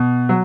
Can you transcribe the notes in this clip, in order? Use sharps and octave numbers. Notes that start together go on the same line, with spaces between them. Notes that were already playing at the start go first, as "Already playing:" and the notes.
Already playing: B2
F#3